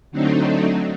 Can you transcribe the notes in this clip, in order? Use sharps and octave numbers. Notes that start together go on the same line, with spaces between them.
D3 F#3 A3 C4 D4 D#4